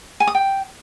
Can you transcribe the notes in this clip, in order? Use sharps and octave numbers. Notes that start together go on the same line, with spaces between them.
G#5
D#6
G5